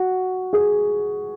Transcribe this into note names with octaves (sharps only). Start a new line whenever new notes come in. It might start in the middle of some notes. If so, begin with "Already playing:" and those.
Already playing: F#4
G#4